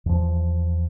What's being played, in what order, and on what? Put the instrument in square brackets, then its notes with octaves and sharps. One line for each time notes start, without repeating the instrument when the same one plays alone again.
[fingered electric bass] E2 F3